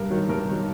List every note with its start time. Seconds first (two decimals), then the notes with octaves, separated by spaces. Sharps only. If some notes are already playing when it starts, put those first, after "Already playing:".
Already playing: G2 A#4
0.10 D#3 F#3
0.29 G2 A#4
0.47 D#3 F#3